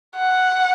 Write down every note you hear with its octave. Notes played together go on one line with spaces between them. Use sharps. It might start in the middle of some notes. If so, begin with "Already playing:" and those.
F#5